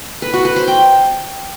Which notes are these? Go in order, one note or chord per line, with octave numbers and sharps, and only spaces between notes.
B4
F#4
B4
C5
G5